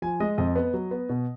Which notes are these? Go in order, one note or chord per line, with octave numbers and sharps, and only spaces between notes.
F3 G#5
G#3 D#5
F2 D#5
B3
F#3
B3
B2